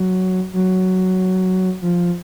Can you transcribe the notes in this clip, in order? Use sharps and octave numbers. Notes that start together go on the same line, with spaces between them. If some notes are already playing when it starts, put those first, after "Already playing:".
Already playing: F#3
F#3
F3